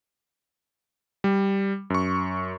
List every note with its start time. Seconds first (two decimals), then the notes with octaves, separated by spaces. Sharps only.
1.24 G3
1.90 F#2 C#6